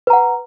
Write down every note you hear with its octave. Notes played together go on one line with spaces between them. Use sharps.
B4 F#5 A#5